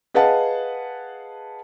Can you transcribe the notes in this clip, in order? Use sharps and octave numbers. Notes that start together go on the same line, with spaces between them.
G#4 B4 D#5 F5 F#5 A5